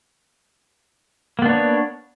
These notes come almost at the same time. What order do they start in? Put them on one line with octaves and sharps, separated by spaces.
A#3 B3 D4 C#5